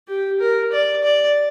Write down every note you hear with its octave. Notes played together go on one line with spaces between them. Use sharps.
G4
A#4
D5
D5